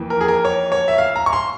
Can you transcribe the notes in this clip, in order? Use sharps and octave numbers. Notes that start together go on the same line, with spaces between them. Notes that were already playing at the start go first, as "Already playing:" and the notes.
Already playing: F2 E3 A#3
A#4
G#4
A#4
C#5
C#5
E5
F5
A#5
C#6
C6